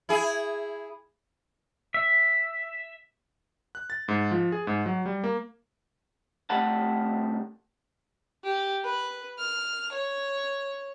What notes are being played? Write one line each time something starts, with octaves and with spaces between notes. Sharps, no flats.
E4 G#4
E5
F#6
A6
G#2
F3
G#4
G#2
F#3
G3
A#3
C2 A3 G4 F#5 A5
G4
B4
F6
C#5